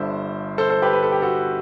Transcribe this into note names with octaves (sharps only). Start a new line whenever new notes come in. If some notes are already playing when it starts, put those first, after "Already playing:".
Already playing: G1 G2 D3 C5 E5
A4 C5
A4 C5
G4 B4
B4
A4
G4
F#4 A4